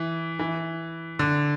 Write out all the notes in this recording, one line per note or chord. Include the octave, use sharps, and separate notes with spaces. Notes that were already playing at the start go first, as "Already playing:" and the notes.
Already playing: E3
E3
D3